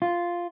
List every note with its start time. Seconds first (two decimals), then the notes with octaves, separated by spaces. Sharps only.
0.02 F4